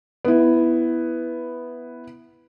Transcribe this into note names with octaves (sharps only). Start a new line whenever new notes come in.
B3 E4